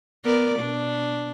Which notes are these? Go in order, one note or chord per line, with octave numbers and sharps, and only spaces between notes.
B3 A#4 D5
B2 D4